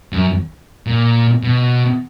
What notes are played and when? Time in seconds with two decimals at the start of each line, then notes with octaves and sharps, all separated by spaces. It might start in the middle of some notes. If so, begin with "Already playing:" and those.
0.13 F#2
0.87 A#2
1.43 B2